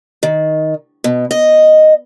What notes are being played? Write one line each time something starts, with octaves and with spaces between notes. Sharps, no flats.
D#3
B2
D#5